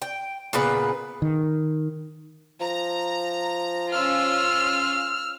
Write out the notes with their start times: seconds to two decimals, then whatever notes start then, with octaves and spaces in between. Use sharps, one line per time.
0.02 G5
0.53 A#2 C#3 B3 B4
1.22 D#3
2.61 F3 A#5
3.92 C#4 F4 E6 F6